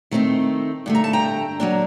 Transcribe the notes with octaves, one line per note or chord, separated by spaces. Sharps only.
D#3 A3 C4 D#4
G2 D3 A3
A#5
A5
G5 A#5
F#3 A#3 D4